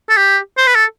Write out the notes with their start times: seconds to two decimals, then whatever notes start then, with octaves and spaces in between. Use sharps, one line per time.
0.09 A4
0.17 G4
0.57 C5
0.67 B4
0.75 A4